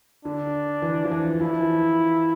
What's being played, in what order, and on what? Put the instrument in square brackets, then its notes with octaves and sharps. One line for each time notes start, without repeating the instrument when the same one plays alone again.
[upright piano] D3 [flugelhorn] D4
[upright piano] E3
F3
E3
[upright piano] F3 [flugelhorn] E4
[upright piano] E3